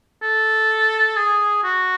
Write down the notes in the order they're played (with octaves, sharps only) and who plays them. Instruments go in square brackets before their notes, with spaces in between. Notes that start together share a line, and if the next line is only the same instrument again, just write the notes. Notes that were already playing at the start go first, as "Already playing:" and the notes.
[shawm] A4
G#4
F#4